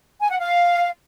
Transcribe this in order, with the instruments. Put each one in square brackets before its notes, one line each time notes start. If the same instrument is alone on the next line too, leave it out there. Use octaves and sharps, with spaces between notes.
[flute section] G#5
F#5
F5